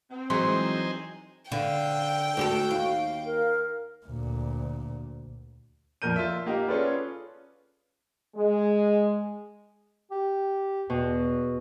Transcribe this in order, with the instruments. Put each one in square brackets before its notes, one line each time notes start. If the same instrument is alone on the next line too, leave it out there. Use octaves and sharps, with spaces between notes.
[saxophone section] C4
[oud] E3 F#3 G#3 [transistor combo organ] D#4 G#4 C5 [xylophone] C6
[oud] D3 [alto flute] F5 [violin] G5
[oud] D2 G4 A4 [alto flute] F#4
[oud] D#2 [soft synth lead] F5
[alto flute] A#4
[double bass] D2 A#2
[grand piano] F2 A#2 F3 A#4 G6 D#7
F4 E5
A#3 D#4 G4 D#5 F5 F#5
C#4 F4 G#4 A4 B4 D5
[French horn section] G#3
[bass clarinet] G4
[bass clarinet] E2 [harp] B2